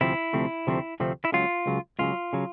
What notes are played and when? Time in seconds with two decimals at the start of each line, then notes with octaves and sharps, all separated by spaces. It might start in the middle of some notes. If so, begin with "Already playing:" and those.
0.01 D2 C3 F3 A3 C4 E4
0.33 D2 C3 F3 A3 C4
0.67 D2 C3 F3 A3 C4
1.00 D2 C3 F3 A3 C4
1.25 E4
1.32 C#2 C#3 F#3 F4
1.66 C#2 C#3 F#3
1.99 C#2 C#3 F#3 F4
2.33 C#3 F#3